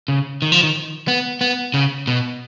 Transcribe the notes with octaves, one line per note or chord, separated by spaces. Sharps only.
C#3
D#3
F3
D#3
B3
B3
C#3
B2